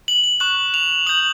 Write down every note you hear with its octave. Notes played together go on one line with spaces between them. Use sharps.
F#7
F#7
C#6 F#6 F#7
F7
D#6 G6 F#7